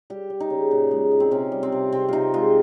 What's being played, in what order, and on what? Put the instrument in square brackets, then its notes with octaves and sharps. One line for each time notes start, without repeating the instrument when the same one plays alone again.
[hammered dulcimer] G3 G4
G3
D#4
C#3
A#2
G#3
A#2
C4
C3 C#4
G3
C4
C3
C3 C4
C3 D#4 F4
G#3 F4